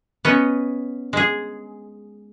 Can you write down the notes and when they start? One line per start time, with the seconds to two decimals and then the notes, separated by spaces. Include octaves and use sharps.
0.25 B3 C#4 D#5
1.13 G#3 G#4